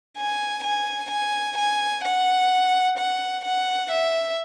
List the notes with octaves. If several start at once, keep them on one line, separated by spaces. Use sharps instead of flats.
G#5
G#5
G#5
G#5
F#5
F#5
F#5
E5